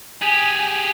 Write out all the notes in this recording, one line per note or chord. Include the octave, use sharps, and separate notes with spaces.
G4 G#4 G#5